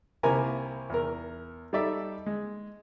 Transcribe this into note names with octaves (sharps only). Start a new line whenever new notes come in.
C2 C3 A#3 E4 A#4 G#5
E2 A#4
G3 D#4 A4 D5 E5
G#3